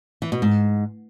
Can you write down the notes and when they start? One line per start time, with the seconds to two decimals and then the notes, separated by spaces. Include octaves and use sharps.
0.22 E3
0.32 B2
0.42 G#2